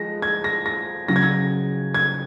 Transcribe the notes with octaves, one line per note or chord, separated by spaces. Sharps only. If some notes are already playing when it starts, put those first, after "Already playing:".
Already playing: F3 G#3 A#6
G#6
A#6
A#6
C#3 F#3 A#6
G#6
A#6
G#6